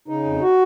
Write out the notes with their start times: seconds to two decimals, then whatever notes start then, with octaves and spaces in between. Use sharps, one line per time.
0.08 C#3 D#4
0.25 F2
0.41 F#4